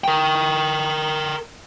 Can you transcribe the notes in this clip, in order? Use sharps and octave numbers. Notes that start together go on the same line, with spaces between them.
A#4 G5